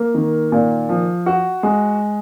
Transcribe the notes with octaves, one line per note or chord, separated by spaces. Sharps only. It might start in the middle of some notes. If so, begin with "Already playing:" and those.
Already playing: A#3
D#3
A#2
F3
F#4
G#3